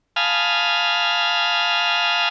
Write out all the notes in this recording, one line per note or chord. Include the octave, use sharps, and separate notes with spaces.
F5 G#5 A5 B5 D#6 F6